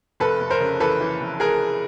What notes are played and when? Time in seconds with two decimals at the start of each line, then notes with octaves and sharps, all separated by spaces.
0.20 F1 A4 B4
0.41 F1
0.50 A#4 C5
0.60 C#3
0.80 E3 A4 B4
1.01 E3
1.21 F1
1.40 G#4 A#4